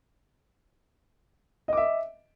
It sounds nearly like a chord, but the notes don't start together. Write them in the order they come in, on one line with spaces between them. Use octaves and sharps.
D#5 D6 E5